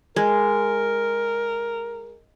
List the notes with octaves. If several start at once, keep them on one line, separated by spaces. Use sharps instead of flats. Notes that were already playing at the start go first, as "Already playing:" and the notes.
G#3 A#4